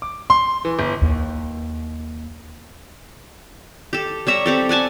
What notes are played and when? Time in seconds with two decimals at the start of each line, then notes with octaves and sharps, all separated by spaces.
0.02 D6
0.30 C6
0.65 E3
0.79 G1
1.01 D#2
3.93 G4 A4
4.27 G3 C#5 E5 A#5
4.46 C4 G4 A4
4.69 D5 F#5 G#5 A5